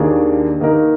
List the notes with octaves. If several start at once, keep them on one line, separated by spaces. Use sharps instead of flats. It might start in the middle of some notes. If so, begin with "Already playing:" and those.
Already playing: D#2 D#3 A#3 D4 G#4
D#3 A#3 D#4 A#4